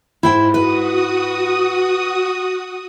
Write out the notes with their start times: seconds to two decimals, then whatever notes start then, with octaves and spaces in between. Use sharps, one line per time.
0.23 G#2 E4 C5 G5
0.54 F#4 B4 D#6